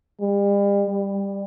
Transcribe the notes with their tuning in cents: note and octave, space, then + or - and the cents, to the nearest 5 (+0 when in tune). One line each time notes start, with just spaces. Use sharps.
G3 +40
G3 +15